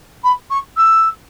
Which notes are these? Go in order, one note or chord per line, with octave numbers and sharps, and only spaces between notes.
B5
C#6
E6